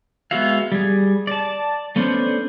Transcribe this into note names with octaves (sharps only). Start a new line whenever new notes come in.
G#3 B3 F#4 E5 F5
G3 G#4
D5 A5
A3 B3 C#4 D4 C5